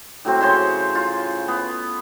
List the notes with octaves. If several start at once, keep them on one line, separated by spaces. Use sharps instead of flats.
A2 F#3 C4
C#3 C5 C#5 C6
F4
B3